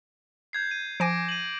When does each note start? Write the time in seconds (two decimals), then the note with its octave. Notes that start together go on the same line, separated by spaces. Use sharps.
0.53 G6 G#6 C7
0.71 D#7
1.00 F3 G#5 D6 A#6 D7
1.29 D#7 F#7